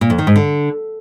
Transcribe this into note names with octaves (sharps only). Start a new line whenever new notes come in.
A#2
F2
D#3
G#2
D3